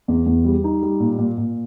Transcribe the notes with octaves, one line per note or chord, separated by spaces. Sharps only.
E2
E2
G3
D#4
G3
A#2
A#2
A#2